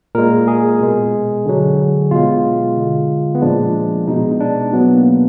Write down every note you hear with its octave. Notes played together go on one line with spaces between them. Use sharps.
A#2 G#3 A#4
G#4
B2 G#3
D3 F#3
B2 G#3 F4
D3 G#3
B3
A#2 F3 G#3 D4
B2 G#3 D#4
D#4
D4
B2 F#3 B3
A#3